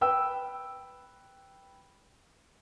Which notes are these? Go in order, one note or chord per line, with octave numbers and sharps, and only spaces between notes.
B4 G5 E6